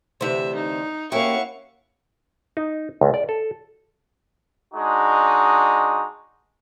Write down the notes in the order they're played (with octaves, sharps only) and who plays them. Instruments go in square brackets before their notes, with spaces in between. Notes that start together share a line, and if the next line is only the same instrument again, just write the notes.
[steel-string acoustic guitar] D2 E3 [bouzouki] C3 C5 [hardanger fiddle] E5
[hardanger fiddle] D#4
[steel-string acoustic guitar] A#3 C#4 G4 [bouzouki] E4 F#4 [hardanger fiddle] F5 C#6
[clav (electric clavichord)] D#4
C#2
D5
A4
[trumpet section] G#3 D4 D#4 F#4